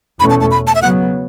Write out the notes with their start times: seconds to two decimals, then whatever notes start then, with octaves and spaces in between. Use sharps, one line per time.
0.20 E2 B2 A3 C#4 B5
0.30 A5
0.41 A5
0.51 B5
0.67 A5
0.75 E5
0.82 C#3 F#3 B3 F#5